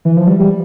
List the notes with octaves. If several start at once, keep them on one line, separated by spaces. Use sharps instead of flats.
E3
F3
G3
G3